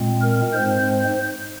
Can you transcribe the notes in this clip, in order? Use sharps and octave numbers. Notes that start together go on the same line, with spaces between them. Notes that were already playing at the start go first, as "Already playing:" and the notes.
Already playing: A#2 G#3 C4
A#4
G#2 G#3 C4 C5